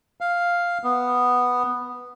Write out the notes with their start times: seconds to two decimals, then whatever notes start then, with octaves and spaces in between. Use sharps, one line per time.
0.21 F5
0.84 B3